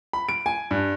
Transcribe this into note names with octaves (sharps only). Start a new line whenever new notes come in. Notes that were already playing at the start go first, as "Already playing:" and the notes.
B5
D7
G#5
G2